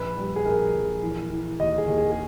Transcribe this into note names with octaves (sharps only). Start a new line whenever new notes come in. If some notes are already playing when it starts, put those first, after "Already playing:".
Already playing: A#1 B4
G3
G#4
A#1 A#4
A#1
E3
E3
D#2 D#5
G#4
D#2
G#4
G#4